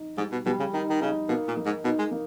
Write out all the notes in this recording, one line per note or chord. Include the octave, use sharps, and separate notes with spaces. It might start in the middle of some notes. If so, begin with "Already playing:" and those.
Already playing: D#4
G#2 G3
B2
B2 G3
C#3
D#3 D#4
D#3
C#3 D#4
B2 A#3
A#2
A#3
G#2
B2 D#4
G#3
A#3